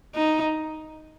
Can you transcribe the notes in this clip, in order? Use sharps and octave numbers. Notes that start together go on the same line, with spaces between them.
D#4